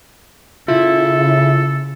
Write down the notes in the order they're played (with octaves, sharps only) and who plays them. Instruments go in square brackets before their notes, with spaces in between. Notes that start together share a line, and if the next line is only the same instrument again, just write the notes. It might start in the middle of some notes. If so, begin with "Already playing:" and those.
[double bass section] C#3 [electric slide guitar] E4 [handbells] F4 [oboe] A4